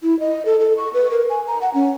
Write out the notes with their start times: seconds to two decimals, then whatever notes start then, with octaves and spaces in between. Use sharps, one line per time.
0.03 E4
0.20 D#5
0.45 A4
0.60 A4
0.77 C#6
0.94 B4
1.11 A#4
1.30 G#5
1.47 A#5
1.62 F#5
1.74 C#4